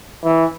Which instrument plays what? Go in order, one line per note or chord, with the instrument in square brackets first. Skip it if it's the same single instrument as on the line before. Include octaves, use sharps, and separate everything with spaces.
[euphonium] E3